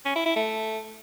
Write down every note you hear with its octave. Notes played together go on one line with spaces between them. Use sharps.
C#4
E4
E4
A3